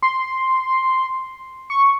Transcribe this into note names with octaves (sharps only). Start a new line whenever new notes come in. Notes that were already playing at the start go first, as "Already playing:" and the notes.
C6
C#6